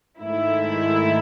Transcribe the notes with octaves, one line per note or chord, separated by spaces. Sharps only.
G#2 D#3 A3 E4